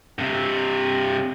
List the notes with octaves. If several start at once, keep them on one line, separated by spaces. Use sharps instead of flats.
G2 C3